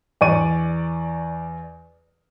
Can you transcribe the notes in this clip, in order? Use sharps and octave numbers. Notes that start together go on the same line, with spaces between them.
E2 D5 C#6 D#7